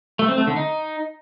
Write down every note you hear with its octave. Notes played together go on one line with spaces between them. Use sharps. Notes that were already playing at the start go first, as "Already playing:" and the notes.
A3
C4
A3
D3
D#4